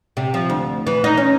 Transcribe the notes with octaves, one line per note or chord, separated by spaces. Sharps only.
C3
F3
D2
E3
D#4
C#4